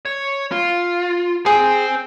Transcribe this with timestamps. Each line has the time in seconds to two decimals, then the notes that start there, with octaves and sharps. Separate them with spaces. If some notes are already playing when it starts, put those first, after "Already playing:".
0.05 C#5
0.52 F4
1.46 G#4 C5 G5